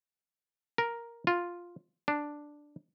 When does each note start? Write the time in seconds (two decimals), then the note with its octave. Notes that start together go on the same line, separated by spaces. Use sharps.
0.78 A#4
1.27 F4
2.08 D4